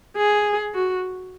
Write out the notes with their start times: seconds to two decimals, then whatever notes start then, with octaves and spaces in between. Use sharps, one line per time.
0.16 G#4
0.74 F#4